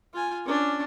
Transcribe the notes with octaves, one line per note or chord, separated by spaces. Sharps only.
F4 G#5
C#4 D4